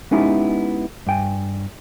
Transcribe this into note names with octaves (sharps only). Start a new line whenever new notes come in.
G#3 B3 C#4 D#4 E4 G4
G2 G5 G#5